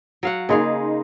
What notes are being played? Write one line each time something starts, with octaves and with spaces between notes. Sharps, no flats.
F#3 F5 F#5
C#3 A#3 D#4 G#4 F5 C6